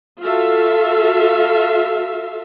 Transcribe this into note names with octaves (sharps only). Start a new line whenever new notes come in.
F4 F#4 A4 E5 F5